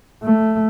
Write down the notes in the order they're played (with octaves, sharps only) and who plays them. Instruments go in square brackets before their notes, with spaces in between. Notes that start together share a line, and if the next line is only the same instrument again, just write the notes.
[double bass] A3